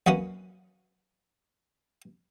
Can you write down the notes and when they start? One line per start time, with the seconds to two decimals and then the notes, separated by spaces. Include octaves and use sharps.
0.06 F#2 A#3 B3 C#4